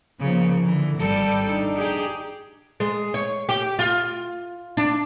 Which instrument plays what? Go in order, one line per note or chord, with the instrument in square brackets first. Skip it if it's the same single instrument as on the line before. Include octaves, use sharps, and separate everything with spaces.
[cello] C#3 [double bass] F3 A#3
[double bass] D3 [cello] E3
[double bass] G#1 [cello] G3 A4
[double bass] D4 D#4
[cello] G4 G#4
[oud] G#3
C#5
G4
F4
D4